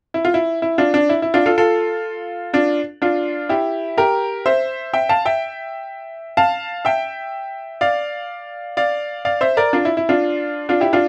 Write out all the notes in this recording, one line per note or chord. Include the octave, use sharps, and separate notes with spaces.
E4
F4
E4
E4
D4 F4
D4
E4
E4
D4 F4
F4 A4
F4 A4
D4 F4
D4 F4
E4 G4
G4 A#4
C5 E5
E5 G5
F5 A5
E5 G5
F5 A5
E5 G5
D5 F5
D5 F5
D5 F5
C5 E5
A#4 D5
D4 F4
E4
E4
D4 F4
D4 F4
E4 G4
D4 F4